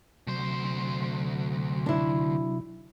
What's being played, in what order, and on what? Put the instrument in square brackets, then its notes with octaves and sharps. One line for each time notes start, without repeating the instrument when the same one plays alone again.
[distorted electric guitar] D2 C5 [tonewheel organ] C3 F#3
[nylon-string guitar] D4 E4